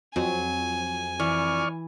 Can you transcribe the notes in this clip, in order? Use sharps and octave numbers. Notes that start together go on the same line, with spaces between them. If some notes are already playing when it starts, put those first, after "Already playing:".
F2 F#3 G#5
E3 D5 C#6 F6